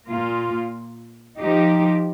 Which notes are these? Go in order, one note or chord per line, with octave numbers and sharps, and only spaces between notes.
A#2 A#3 F4
F3 D#4 G4